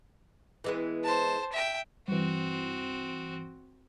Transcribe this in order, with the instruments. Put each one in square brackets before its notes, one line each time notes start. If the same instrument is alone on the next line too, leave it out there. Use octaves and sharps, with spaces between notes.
[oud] E3 G#3 B3
[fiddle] C5 A5
E5 G5
[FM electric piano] G2 E3 [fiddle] C4 F#4